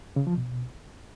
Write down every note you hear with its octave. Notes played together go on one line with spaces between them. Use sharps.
C#3
F3
B2